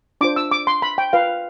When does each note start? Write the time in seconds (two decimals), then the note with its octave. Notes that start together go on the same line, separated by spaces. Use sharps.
0.21 D4 F4 C5 D6
0.36 E6
0.51 D6
0.67 C6
0.82 B5
0.98 G5
1.13 F4 B4 F5